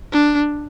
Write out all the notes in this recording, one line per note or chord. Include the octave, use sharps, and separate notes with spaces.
D4